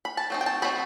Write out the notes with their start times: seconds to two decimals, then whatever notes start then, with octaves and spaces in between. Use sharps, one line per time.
0.05 B5
0.17 A5
0.30 F#3 C4 D#4
0.41 G5
0.46 A5
0.62 F#3 C4 D#4 B5